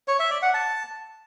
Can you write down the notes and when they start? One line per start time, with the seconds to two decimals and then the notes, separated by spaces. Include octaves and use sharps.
0.08 C#5
0.19 E5
0.31 D5
0.42 F#5
0.54 A5